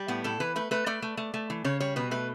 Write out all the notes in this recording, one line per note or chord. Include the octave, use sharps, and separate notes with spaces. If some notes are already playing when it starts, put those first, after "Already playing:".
Already playing: G3
A2 B3
A2 A4
E3 B4
A3 B4
A3 B4
A3 D5
A3
A3
A3
E3
C#3 C#5
G3 C#5
B2 B4
A3 B4